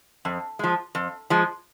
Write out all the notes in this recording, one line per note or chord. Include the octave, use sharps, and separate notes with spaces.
F2
F3 G#3
F2
F3 G#3